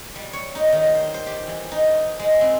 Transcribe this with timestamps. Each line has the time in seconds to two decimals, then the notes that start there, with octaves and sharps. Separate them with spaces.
0.16 G3
0.33 C#5
0.55 D#4
0.72 D#3
0.95 C5
1.14 C5
1.26 G4
1.47 E3
1.72 D#4
2.19 G#3
2.41 C4